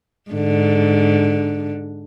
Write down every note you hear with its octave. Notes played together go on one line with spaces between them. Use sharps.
G#2 D3